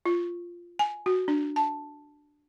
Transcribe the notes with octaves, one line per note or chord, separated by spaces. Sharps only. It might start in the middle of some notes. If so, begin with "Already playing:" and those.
F4
G#5
F#4
D4
A5